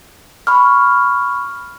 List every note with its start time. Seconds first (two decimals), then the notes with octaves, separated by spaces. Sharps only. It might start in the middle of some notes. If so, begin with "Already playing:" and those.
0.47 B5 C#6 F6